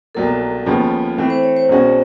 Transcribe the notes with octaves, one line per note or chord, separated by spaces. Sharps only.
C2 B2 F#3 A#3 A4
D#2 C#3 F3 G#3 B3
E3 A3 C4
C5
C#5
C5
C2 B2 G#3 C#4 F#4